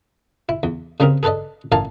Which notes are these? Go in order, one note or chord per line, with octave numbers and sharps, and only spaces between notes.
E4
E2
C#3 G3 C4 G#4 A#4
G#4 A4 B4 D5 D#5
A1 A#4 F5 G#5 A5